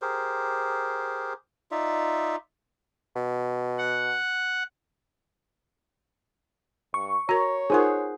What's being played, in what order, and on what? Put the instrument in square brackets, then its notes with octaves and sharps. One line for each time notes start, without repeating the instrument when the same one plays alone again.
[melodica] G4 G#4 A#4 C5
D#4 F4 D5 E5
[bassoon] B2
[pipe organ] F#5
[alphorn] G2 [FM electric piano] C#6
[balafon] F#4 A#4 [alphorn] C#5 [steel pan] A#5
[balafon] D#4 F4 A#4 [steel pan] G#4 C5 F#5